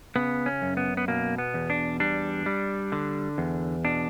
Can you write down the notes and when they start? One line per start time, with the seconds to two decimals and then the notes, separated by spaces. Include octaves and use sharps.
0.16 C#3 B3
0.46 C#4
0.62 F#2
0.77 B3
0.97 B3
1.08 B2 A#3
1.38 B3
1.54 E2
1.70 D4
2.00 G3 D4
2.46 G3
2.92 D3
3.38 E2
3.85 B2 D4